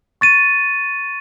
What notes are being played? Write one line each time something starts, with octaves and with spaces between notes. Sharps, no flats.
C#6 A6 D#7